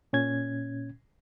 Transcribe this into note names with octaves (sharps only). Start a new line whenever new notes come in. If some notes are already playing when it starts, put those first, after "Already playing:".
A#2 C#4 G#6